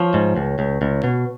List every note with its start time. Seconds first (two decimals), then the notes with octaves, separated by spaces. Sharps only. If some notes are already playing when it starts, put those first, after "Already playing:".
Already playing: F3 C#5
0.14 G#2
0.36 C#2
0.59 C#2
0.82 C#2
1.04 B2